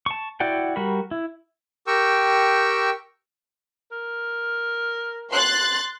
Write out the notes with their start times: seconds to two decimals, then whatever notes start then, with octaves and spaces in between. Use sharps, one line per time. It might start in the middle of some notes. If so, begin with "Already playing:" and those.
0.06 A5 C#6
0.40 E4 F#4 D5 F#5 G5
0.76 G3 F#4 A#4 B5
1.11 E4
1.87 G4 A#4 G5 C#6 E6
3.92 A#4
5.31 C6 F#6 A6